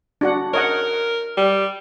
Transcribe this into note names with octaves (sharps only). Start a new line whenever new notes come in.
D4 F#4 F#5
A#4 C#5 D#5 F#5
G3